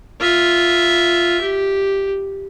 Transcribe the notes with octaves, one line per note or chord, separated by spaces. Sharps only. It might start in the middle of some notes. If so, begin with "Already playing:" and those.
F4 E5
G4